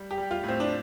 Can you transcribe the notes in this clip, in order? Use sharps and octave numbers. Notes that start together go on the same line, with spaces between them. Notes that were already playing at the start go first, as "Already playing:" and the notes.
Already playing: G3
G4
G3
F4
A2
C4
D4